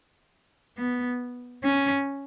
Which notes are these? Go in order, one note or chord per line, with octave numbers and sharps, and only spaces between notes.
B3
C#4